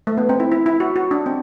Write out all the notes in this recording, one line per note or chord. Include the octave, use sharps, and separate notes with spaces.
A3
B3
C4
E4
E4
E4
F#4
F#4
D4
C4